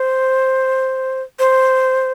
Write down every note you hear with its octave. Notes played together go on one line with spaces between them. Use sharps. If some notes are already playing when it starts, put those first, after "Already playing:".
Already playing: C5
C5